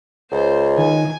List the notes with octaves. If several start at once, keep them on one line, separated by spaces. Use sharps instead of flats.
C#2 C5
D#3 G#5